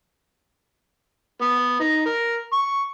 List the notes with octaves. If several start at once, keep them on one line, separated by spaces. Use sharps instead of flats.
B3
D#4
A#4
C#6